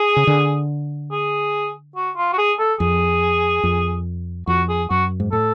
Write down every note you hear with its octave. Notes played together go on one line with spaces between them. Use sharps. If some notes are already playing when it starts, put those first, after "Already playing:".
Already playing: G#4
C#3
D3
G#4
F#4
F4
F#4
G#4
A4
F2 G#4
F2
F2 F#4
G#4
F#2 F#4
G#2
A2 A4